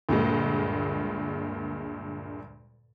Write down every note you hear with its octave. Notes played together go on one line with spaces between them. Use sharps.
D2 G2 A#2 G#3